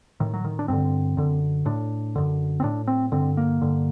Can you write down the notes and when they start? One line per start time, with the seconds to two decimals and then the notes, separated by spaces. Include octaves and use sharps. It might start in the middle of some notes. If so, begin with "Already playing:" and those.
0.20 A2 D#3
0.34 F#3
0.45 D#3
0.59 D4
0.68 G2 D3 C4
1.17 F#2 D3
1.66 A2 D4
2.16 F#2 D3
2.60 C4
2.63 A2 D4
2.87 C4
3.12 G2 D3 C4
3.37 A#3
3.62 G2 D3